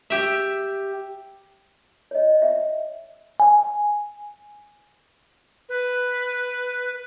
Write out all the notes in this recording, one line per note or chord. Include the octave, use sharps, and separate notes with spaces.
G4 E5
C#5 D#5
E5 G5
G#5
B4